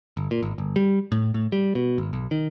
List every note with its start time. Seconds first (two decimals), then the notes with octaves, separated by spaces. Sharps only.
0.17 G1
0.31 A#2
0.43 G#1
0.58 G1
0.76 G3
1.12 A2
1.34 A2
1.52 G3
1.75 B2
1.98 G#1
2.13 B1
2.31 D#3